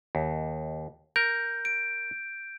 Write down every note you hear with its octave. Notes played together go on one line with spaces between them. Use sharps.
D#2
A#4 G6
D7